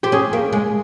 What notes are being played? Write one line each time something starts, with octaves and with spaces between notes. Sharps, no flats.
C4 G4
C#4 G#4
A#3
G#3